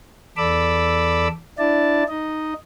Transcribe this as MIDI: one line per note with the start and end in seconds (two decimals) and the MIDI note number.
0.37 1.28 40
0.37 1.28 69
0.37 1.28 74
0.37 1.28 83
0.37 1.28 86
0.37 1.28 88
1.59 2.03 62
1.59 2.03 64
1.59 2.03 74
1.59 2.03 81
2.09 2.54 63
2.09 2.54 75